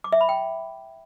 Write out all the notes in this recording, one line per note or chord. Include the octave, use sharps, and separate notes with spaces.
D6
E5
B5
G5